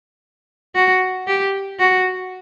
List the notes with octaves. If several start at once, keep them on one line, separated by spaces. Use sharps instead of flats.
F#4
G4
F#4